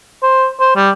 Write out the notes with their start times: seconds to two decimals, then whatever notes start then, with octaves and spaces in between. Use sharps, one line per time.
0.23 C5
0.60 C5
0.76 G3